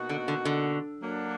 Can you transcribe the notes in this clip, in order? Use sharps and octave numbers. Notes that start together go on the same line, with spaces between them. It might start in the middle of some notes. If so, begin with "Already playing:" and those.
Already playing: B2 A#3 D#4 F#4
D3
D3
D3
F#3 A#3 D4